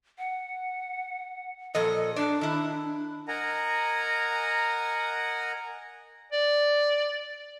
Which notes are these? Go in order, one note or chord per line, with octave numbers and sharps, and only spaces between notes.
F#5
A#2 F3 A4 D#5
D4 D5
D#3 E4
A#4 D#5 F#5 G#5 A#5
D5